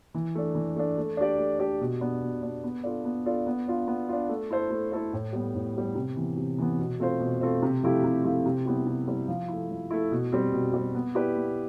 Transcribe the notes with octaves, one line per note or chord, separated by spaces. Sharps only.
E3
A3 D4
E3
A3 D4
A3
D4 G4 D5
A3
D4 G4 D5
B2
B3 D4
B2
B3 D4
B3
D4 F4 A4 D5
B3
D4 F4 A4 D5
B3
D4 F4
B3
D4 F4
A3
E4 A4 C5
A3
E4 A4 C5
A2
G3 B3
A2
G3 B3
C3
E3 B3
C3
E3 B3
B2
A3 C4 F4 C5
B2
A3 C4 F4 C5
C3
F3 A3 E4 G4
C3
F3 A3 E4 G4
C3
G3 B3 E4 G4
C3
G3 B3 E4 G4
F3
E4
A3
F3
A3 E4
B2
G3 C4
B2
G3 C4
B3
E4 G4 B4 D5
B3